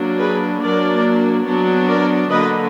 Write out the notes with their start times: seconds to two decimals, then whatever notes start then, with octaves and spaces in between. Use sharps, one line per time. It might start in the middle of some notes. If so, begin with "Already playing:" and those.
Already playing: F#3 A#3 D4
0.19 G#4 B4
0.61 F#3 A#3 D4 A#4 D5
1.45 F#3 B3 D4
1.88 A#4 D5
2.30 D3 F#3 A#3 B4 D#5